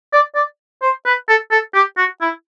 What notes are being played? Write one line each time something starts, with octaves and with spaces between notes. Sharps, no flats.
D5
D5
C5
B4
A4
A4
G4
F#4
E4